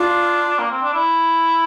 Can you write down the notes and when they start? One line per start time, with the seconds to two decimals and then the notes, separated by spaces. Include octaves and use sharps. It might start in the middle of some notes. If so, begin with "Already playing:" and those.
Already playing: D4 F4
0.59 A#3
0.71 C4
0.82 D4
0.94 E4